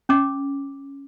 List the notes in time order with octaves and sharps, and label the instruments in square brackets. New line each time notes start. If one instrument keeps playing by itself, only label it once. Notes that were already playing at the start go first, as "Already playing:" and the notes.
[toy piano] C#4 D6